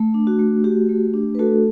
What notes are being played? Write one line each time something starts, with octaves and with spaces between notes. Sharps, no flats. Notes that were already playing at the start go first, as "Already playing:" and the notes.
Already playing: A3
D4
F#4
A3
F#4 G4
A3
D4
B4
A3 F#4 A4